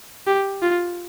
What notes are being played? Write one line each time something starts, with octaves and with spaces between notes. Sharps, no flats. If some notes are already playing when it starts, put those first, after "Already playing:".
G4
F4